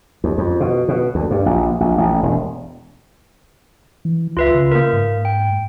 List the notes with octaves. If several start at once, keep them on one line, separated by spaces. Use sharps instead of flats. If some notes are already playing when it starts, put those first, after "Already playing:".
D#2
F2
B2
B2
D2
G2
A#1
A#1
A1
E1
E3
C#2 F4 B4 E5
C#3
A#3 A#4
G#2
G5